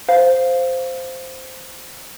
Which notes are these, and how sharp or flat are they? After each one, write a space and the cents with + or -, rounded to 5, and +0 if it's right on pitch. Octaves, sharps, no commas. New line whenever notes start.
C5 -5 F5 +0